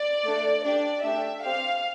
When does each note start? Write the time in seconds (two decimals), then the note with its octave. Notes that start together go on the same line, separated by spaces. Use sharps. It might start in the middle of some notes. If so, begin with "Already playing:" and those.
Already playing: D5
0.25 A3 D4 A4
0.64 D4 G4 D5
1.04 A3 D4 G4 E5
1.43 C4 G4 F5